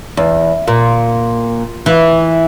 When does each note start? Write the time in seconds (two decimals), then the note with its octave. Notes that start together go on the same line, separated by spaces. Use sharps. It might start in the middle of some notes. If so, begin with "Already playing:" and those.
0.17 E2
0.68 A#2
1.86 E3